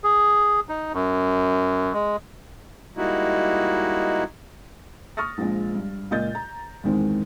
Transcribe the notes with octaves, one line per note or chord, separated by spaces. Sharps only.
G#4
D#4
F#2
G#3
G3 G#3 A#3 D#4 E4 F#4
C#6 D#6 F6 A6 A#6
A#1 F3 G#3
G2
C#2 A#2 D#5 G6 A6
A#5
E2 G#2 D#3 G#3 C4